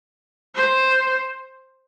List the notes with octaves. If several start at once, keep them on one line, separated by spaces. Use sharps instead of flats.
C5